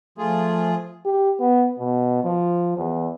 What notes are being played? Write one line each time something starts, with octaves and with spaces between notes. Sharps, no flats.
F3 A3 F4 G#4
G4
B3
B2
F3
E2